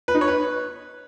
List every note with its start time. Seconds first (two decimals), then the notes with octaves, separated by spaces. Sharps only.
0.08 B4
0.15 D#4
0.21 C#5
0.28 B4